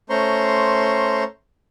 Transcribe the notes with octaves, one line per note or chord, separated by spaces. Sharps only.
A3 C#4 C5 A#5 C6 C#6